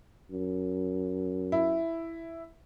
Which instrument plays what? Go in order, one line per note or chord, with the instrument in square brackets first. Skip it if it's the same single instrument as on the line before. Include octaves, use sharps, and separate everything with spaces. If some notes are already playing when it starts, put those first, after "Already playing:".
[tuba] F#2
[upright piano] E4